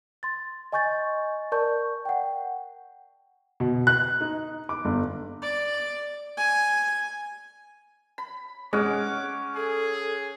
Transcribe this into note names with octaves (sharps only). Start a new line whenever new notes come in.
C6 A6
D#5 G#5 C#6 G6 A6
A#4 D5 A5 C#6 G6
F#5 G5
B2
F#6
D#4
D6
G1
D5
G#5
B5
G#3 C#4 F#5 D6
G#4 A4